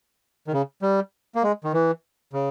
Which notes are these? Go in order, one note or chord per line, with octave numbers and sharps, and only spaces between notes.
D#3
C#3
G3
A#3
G#3
D#3
E3
C#3